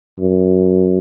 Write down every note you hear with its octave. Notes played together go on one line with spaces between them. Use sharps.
F#2